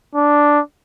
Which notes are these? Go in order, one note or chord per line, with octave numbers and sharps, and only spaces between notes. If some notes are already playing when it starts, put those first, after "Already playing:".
D4